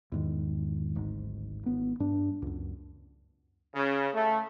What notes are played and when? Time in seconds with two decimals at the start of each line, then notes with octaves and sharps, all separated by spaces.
0.12 E2 G#2 D#3
0.95 D1 G#1 G#2
1.63 G#1 B3
2.00 G2 D4
2.42 C#2 F#2
3.75 C#3
4.14 A3